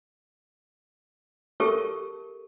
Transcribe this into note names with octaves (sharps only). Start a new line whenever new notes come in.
G4 A4 A#4 E5 A5 C#6